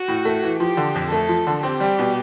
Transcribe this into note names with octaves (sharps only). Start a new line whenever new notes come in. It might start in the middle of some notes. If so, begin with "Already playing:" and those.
Already playing: F#4
A2
A3
E3
F3 G4
D3
F2
A3 A4
F3
D3
C4 G4
G3
B2